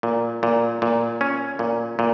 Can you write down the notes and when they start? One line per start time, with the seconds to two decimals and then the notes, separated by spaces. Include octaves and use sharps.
0.03 A#2
0.43 A#2
0.82 A#2
1.21 C#4
1.59 A#2
1.99 A#2